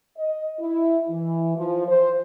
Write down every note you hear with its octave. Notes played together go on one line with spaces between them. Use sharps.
D#5
E4
E3
F3
C5